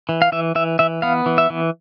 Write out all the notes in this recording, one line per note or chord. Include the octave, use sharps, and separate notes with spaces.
E3
F5
E3 E5
E3 E5
E3 E5
B3 F5
E3
E5
E3